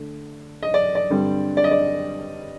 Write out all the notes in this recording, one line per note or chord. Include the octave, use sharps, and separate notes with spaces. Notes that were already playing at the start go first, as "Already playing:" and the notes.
Already playing: D3 A3
D#5
D5
D5
G2 D3 G3 C4
D5
D#5
D5